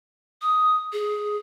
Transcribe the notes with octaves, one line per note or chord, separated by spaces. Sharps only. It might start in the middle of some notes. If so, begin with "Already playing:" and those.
D#6
G#4